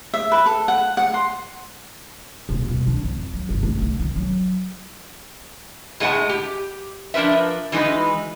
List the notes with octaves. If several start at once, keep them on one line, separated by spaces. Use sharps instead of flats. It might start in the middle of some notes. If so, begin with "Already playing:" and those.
E5
B4
A4
F#5
F#5
C6
D#1
B2
D4
F2
F#3
G1
A3
D3
A#3
F#3
A2 G#3 B3 D#4 F#5 A5
G4
F3 D4 A#4 B4 E5
E3 G#3 D#4 F#4 B4